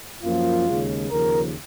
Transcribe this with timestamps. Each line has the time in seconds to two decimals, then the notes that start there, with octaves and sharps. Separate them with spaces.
0.24 F#2 F3 A#3 F4
0.67 D#2 C#3 G#3
1.10 D#2 C#3 F3 A#4